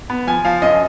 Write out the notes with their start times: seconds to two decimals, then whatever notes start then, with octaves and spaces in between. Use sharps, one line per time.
0.10 B3
0.27 F3 G#5
0.45 F3 F5
0.62 F#2 D#5